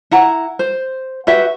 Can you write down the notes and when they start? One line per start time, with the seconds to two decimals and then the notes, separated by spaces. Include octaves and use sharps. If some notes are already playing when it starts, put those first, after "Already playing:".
0.11 E4 F#5 A#5
0.59 C5
1.27 F#4 G4 B4 E5